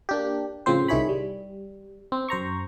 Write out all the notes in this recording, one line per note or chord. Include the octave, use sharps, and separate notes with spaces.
A#3 D4 G4
A2 C#3 F3 C4 C5
C2 D#3 E4 G#4 C#5 B5
G3
C4
F#2 C5 A#5 C#6